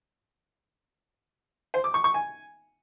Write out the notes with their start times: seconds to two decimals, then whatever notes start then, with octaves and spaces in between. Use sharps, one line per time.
1.74 C5
1.84 D6
1.94 C#6
2.04 C#6
2.14 G#5